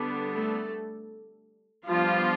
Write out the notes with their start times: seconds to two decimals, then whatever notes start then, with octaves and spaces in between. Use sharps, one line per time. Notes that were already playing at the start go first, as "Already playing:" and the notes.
Already playing: D3 G3 B3 D4
0.33 A3 A4
1.87 F3 G3 B3 D4 F4